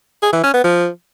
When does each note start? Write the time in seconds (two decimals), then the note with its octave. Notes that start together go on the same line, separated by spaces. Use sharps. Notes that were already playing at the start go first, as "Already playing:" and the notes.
0.23 G#4
0.33 E3
0.43 C#4
0.54 B3
0.64 F3